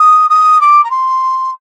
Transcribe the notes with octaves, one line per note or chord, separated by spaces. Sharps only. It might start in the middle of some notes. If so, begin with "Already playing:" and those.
Already playing: D#6
D#6
D6
A#5
C6